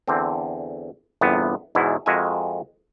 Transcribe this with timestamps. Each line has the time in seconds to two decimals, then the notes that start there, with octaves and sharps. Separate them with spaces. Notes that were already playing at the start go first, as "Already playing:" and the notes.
0.08 E2 D3 C4
1.21 G1 E2 C3 B3
1.75 E2 G#2 B2 E4
2.06 F2 G#3 F#4 A#4 E5 G#5